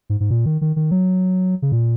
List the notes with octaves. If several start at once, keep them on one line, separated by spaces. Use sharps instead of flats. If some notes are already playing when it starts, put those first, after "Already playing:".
G#2
G#2
A#2
D#3
D#3
D#3
F#3
C#3
A#2